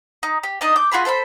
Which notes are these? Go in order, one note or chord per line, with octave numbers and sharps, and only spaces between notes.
D#4
G4
D4 D#4 D#5
D6 G6
F4 F#4 G#4 B5
A4 C5 F5 B5